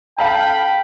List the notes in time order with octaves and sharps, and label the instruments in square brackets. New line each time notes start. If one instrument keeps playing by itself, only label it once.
[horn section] A4 B5 [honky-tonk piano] F5 A5 [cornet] G5